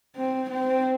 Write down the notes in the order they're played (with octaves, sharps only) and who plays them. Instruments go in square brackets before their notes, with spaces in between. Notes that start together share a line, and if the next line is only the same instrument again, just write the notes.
[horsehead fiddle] C4
C4